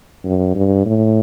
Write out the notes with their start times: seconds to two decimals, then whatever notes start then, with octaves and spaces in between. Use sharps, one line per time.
0.25 F#2
0.55 G2
0.86 A2